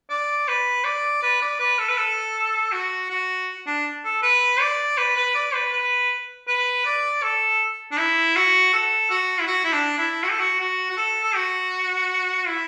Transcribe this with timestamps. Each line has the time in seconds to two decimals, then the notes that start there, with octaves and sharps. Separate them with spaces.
0.10 D5
0.48 B4
0.85 D5
1.23 B4
1.42 D5
1.60 B4
1.79 A4
1.89 B4
1.98 A4
2.72 F#4
3.11 F#4
3.67 D4
4.05 A4
4.23 B4
4.61 D5
4.98 B4
5.17 B4
5.35 D5
5.54 B4
5.73 B4
6.48 B4
6.86 D5
7.23 A4
7.92 D4
7.98 E4
8.36 F#4
8.73 A4
9.10 F#4
9.40 E4
9.47 F#4
9.64 E4
9.73 D4
9.98 E4
10.23 F#4
10.31 A4
10.40 F#4
10.61 F#4
10.90 F#4
10.97 A4
11.23 A4
11.36 F#4
12.48 E4